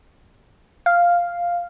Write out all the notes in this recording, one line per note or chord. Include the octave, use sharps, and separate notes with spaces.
F5